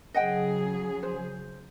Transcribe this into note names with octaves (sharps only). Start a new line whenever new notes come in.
C#3 F#3 G#4 D#5 F#5 G5
C5